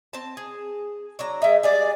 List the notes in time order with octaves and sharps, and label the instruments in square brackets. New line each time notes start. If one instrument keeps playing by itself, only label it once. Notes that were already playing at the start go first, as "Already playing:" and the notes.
[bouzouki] C4 A5
G#4
F#3 D4 A#5
[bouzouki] G#3 D#4 [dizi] E5
[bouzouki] G3 G#3 G#4 [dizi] D5